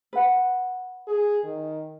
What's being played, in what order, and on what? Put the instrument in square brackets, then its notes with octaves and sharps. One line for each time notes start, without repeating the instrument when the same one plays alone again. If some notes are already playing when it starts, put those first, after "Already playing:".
[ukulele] B4 F#5
[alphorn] G#4
D#3